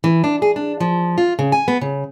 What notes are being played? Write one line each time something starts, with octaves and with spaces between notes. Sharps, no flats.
E3
D4
G#4
D4
F3
F4
C#3
G#5
B3
C#3